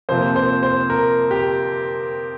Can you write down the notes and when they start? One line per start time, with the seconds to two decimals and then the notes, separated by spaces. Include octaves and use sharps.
0.09 F2 C3 F3 A#3 C5
0.36 C5
0.63 C5
0.90 A#4
1.31 G4